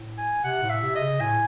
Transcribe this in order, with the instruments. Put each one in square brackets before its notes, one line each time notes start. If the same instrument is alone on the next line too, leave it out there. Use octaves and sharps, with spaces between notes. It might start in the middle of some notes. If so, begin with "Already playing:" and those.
Already playing: [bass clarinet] A2
[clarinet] G#5
[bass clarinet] C3 [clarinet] F#5
[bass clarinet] A2
[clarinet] E5
[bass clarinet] C3
[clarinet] D#5
[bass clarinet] C#3
[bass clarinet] A2 [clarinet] G#5